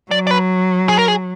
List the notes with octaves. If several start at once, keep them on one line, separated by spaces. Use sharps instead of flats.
F#3 D5
D5
B4
G#4
A#4
G#4